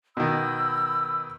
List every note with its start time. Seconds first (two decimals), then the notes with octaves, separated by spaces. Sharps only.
0.17 B2 D#3 B5 E6